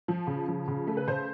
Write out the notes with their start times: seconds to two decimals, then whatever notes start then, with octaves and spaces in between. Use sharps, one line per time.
0.08 F3
0.27 C#3
0.48 F3
0.68 C#3
0.87 A3
0.97 B4
1.08 C#3 C5